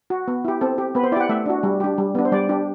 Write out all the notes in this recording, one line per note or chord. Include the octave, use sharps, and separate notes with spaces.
F#4
B3
E4 G4
C4 A4
G4
B3 B4
C5
E4 G4 D5 F#5
A3 E5
D4 F#4
G3
D4 G4
G3
B3 D4
C5
G3 D5
D4 G4